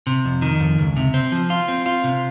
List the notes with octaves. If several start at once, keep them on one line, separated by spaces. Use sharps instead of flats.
C3
F2
D#3
F2
C#2
C3
C4
F3
F4
C4
F4
C3